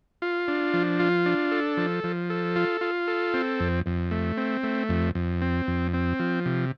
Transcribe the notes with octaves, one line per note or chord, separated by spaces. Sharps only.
F4
D4
F3
F4
D4
A4
F3
F3
A4
F4
F4
A4
C4
F2
F2
A3
C4
A3
F2
F2
C4
F2
C4
F3
C3